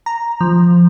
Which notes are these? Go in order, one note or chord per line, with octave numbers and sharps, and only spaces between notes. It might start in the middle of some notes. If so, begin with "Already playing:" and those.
A#5
F3